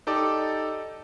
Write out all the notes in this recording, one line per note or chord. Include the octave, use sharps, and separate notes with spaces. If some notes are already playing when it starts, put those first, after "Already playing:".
D#4 G4 A4 D5 D6